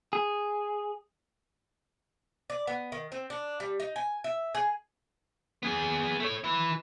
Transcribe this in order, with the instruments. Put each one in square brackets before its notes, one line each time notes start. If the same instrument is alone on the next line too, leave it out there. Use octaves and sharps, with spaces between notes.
[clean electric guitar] G#4
[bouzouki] D5
B3
D#3
C4
D4
G3
D#4
G#5
E5
G#4
[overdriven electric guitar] B3 G#4
A3 C#5
E4 B4